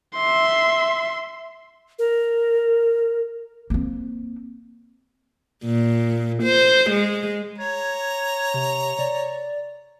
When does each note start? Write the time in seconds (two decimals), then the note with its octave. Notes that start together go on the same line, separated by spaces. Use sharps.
0.16 E5 C6
1.99 A#4
3.70 A#3 C4
5.65 A#2
6.43 C5
6.91 G#3
7.58 C#5 A#5 G#6
8.54 C3
8.99 D5